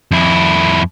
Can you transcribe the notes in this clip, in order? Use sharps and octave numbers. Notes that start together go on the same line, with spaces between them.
F2 E4